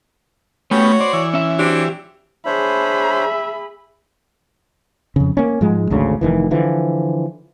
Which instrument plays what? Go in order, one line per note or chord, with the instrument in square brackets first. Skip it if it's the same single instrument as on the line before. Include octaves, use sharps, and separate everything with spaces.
[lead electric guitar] A3 [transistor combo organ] B3 C#4 G4 [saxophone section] F#4 C#5
[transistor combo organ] C5 [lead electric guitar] D5
[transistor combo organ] E3
[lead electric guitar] C#4 E5
[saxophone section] F#3 C4 D4 [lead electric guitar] G4
[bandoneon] D4 C5 C#5 [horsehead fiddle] G#4 B5 [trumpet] E5
[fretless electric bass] F2 C#3
A#3 C#4
G#2 F3 G#3
G#1 D2 C#3
F1 D#3 E3
D3 E3 F3